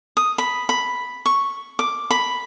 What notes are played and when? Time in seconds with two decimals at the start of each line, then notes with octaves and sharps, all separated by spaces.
0.17 D#6
0.38 B5
0.69 B5
1.26 C#6
1.79 D6
2.11 B5